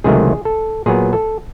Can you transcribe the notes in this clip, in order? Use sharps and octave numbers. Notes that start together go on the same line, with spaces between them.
C#2 C3 D#3 F#3 A3 G#4
A4
A#2 F#3 B3 G#4
A4